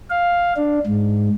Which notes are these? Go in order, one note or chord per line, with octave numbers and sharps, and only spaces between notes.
F5
D4
G#2